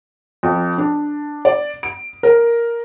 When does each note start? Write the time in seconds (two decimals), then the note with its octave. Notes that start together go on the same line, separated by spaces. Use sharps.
0.43 F2
0.78 D4
1.45 D5
1.83 D7
2.23 A#4